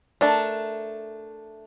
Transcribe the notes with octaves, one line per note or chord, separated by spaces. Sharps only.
A3 D4 A#4 A5